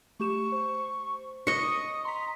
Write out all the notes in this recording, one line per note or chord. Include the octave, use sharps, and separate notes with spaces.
A3 G4 C#6 E7
C5
D#5 C#6 D#6
A#5 C6 B6